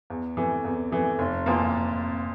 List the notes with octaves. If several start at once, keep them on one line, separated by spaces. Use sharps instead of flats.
E2
C3 E3 A3
E2
C3 E3 A3
F1
F2 E3 A#3 F4